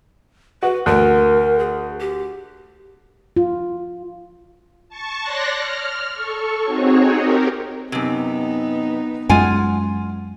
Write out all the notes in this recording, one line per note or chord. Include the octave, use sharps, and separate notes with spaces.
F#4 B4
D2 A#4
G#4
G4
F4
A5 C#6
C#5 D5 C6 F#6 A#6
F6
A4 C#6
C4 D#4 F#4 G#4 C#5
G4 A#4
F#2 C3 B3 D#4
F#2 G#3 F4 F#5 G#5